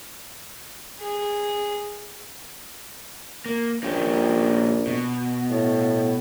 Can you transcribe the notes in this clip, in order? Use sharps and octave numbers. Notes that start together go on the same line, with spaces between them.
G#4
A#3
A#1 A#3 C#4 G4
B2
A2